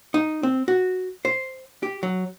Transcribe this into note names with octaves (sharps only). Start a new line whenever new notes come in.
D#4
C4
F#4
C5
G4
F#3